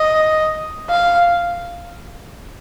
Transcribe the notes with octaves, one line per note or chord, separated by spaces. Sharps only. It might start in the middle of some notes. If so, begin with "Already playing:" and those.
Already playing: D#5
F5